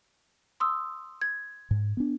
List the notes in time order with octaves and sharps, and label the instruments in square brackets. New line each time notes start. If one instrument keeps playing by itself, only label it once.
[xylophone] C6 D#6 E6
G#6
[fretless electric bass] G#2
B3 D4